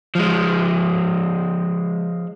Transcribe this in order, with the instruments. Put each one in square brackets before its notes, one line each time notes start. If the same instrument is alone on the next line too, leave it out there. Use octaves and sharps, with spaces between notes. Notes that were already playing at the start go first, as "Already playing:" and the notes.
[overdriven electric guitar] F3 G#3